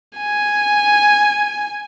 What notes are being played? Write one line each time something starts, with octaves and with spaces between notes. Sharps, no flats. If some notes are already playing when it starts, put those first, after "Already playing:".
G#5